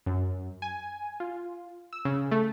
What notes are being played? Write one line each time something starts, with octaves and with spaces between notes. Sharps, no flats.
F#2
G#5
F4
E6
C#3
A3